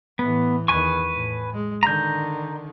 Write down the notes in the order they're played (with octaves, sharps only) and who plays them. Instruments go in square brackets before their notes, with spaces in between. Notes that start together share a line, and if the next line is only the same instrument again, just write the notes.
[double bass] A2 E3 [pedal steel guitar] B3
[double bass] E2 D#3 [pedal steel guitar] B4 G#5 C#6
[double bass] A2
G#3
[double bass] D3 D#3 [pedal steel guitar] A#5 G6